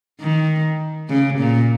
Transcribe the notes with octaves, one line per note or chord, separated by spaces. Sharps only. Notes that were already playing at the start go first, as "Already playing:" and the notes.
D#3
C#3
A#2